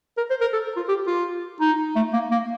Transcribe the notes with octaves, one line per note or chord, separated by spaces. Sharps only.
A#4
C5
A#4
A4
F4
G4
F4
D#4
A3
A#3
A#3